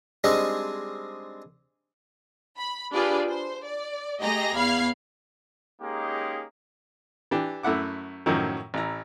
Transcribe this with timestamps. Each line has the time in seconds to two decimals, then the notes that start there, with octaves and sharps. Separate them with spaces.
0.24 G3 G#3 C4 D4 D#4 G#4
2.58 B5
2.92 D4 F4 G4 G#4 B4 D5
3.28 C5
3.65 D5
4.22 A3 G4 G#4 D#5 A#5 A#6
4.56 E2 F5 B5 F6 G#6 C7
5.82 G#3 A#3 C#4 D#4 G4 G#4
7.31 E3 D4 G4
7.63 F#2 A3 E4 F#5 D6
8.26 F#2 A2 D#3 F3 F#3
8.74 A1 E4 A#5